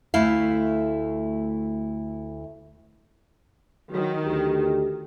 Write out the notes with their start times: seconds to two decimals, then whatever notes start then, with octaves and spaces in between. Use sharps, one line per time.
0.14 D2 A3 E4 F5
3.92 D#3 F#3
4.26 D2 G4